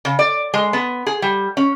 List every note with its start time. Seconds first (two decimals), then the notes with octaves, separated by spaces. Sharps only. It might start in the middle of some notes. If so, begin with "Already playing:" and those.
0.05 C#3
0.19 D5
0.54 G#3
0.73 B3
1.07 G#4
1.22 G3
1.57 C#4